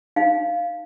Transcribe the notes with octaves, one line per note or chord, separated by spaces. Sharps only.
D#4 F5